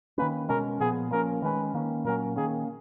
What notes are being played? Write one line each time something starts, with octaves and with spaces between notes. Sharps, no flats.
D#3 A#3 C#4 B4
B2 G#3 C#4 A#4
A#2 F3 B3 G#4
F3 A#3 C#4 A#4
D#3 G#3 C#4 B4
D#3 A#3 C#4
A#2 F#3 A#3 C#4 A#4
D#3 A#3 C#4 G#4